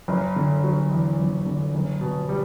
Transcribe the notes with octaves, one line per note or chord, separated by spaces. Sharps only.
F#1
D3
F#3
E2
F#1
D3
F#1
B2
G3